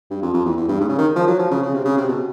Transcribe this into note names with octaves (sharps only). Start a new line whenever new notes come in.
G2
F2
F2
E2
E2
G2
G#2
C#3
D#3
F3
F#3
F3
C#3
C#3
C3
C#3
C3
B2